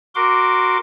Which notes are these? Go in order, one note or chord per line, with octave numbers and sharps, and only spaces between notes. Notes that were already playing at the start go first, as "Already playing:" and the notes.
F#4 A#4 C6 D6